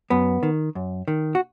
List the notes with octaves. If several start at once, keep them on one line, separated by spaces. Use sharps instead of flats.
F#2 B3
D#3
F#2
D#3
F#4